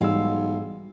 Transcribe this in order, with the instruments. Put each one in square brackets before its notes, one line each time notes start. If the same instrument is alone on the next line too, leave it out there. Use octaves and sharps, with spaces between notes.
[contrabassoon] B1 [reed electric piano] G#2 G3 E6 [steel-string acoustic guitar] E3 G#3 F5